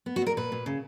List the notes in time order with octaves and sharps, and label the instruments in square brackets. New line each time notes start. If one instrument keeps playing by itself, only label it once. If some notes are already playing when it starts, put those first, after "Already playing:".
[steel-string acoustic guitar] B3
F#4
A#2 A#4
A#2 B4
A#2
C#3